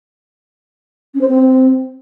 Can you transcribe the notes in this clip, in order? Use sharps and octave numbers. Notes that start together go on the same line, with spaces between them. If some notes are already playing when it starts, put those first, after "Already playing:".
C#4
C5
C4